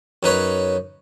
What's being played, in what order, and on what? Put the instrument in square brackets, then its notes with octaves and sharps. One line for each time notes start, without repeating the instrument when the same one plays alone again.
[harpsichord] F#2 D#4 B4 C#5